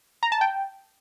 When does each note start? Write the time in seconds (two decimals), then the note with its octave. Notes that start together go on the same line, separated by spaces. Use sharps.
0.23 A#5
0.32 A5
0.41 G5